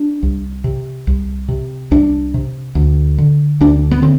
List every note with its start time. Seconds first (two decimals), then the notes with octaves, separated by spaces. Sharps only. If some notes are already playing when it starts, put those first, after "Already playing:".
Already playing: D4
0.23 C2
0.64 C3
1.07 C2
1.48 C3
1.91 C2 D4
2.34 C3
2.75 D2
3.18 D3
3.61 D2 D4
3.91 B3
4.02 D3 C4